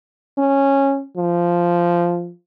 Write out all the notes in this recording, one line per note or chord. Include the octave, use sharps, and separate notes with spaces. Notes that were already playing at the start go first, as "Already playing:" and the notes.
C#4
F3